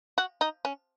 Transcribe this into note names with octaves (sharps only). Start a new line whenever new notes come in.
F#4
D#4
C#4